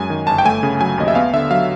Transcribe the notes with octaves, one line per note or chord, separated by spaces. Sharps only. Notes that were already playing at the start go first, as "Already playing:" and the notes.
Already playing: F#2 G#3 G#5
D#3
G1 A5
G5
A3 G#5
C#3
F#3 G#5
D#2 D#5
E5
B3 F5
D3 E5
F#3 F5